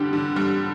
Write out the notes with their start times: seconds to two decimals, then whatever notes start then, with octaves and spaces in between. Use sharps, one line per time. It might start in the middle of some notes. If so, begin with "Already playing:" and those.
Already playing: D3 G3 D4 G4
0.13 D3
0.36 G3